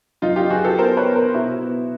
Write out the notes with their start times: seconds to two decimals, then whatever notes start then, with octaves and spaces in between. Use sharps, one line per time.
0.22 F#2 D#4 F4
0.36 F4 G4
0.50 F#2 F#4 G#4
0.64 G4 A4
0.78 B3 A#4 C5
0.97 B4 C#5
1.06 B3
1.16 A#4 C5
1.34 B2 E4 F#4
1.62 B3